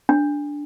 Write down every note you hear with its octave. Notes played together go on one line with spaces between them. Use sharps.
D4